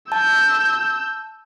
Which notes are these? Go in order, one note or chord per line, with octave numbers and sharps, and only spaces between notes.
A5 E6 G6